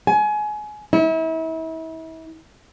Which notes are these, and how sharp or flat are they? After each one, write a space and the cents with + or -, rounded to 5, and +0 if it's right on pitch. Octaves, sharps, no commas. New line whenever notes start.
G#5 +25
E4 -35